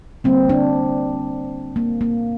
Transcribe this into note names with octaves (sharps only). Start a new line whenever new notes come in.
D3 G3 A#3 C4
D4
A#3
A#3